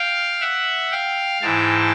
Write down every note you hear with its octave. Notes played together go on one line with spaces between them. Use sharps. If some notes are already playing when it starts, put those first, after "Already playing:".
Already playing: F5 G5
E5 F#5
F5 G5
G#2 E3 G5 A5